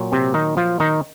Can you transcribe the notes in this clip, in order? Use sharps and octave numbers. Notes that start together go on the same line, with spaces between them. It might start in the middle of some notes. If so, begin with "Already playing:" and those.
Already playing: A#2 F#3
C3 C4
D#3 D#4
F3 F4
D#3 D#4